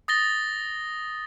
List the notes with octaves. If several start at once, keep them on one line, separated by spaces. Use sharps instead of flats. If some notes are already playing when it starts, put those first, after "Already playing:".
D#6 A6 A#6 G7